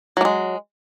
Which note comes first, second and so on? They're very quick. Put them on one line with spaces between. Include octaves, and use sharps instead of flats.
F#3 A#3 G#3